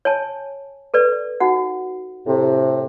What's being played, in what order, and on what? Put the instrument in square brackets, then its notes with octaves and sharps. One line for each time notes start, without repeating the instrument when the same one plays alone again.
[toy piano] C#5 G#5 A5
A4 B4 D5
D#4 F#4 F#5
[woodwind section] A2 C3